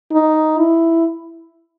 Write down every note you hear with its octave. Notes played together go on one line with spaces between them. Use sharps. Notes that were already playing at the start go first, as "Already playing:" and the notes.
D#4
E4